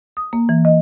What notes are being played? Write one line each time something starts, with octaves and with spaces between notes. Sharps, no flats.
D#6
A#3
E3
D#5